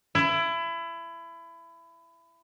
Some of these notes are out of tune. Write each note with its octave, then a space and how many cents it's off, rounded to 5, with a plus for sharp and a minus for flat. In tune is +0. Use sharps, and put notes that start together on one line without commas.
E4 +25